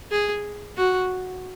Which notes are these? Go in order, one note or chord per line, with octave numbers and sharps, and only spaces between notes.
G#4
F#4